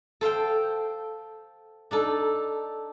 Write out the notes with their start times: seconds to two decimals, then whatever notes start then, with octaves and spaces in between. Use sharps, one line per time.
0.21 A4 C5 F5 G5
1.91 D4 D#4 A4